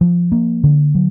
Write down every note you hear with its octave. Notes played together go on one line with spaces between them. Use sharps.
F3
A#3
D3
F#3